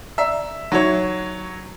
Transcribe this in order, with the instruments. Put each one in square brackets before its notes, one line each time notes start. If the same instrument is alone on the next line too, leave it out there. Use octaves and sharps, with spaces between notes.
[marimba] D5 A#5 [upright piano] E5
[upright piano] F#3 C#5 [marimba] D#4 E5